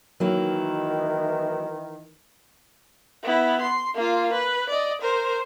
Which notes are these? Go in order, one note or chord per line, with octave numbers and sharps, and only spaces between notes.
D#3 E3 F#3 A#3 E4
B3 E4
C6
A#3 F4
B4
D5 D#5
A#4 C5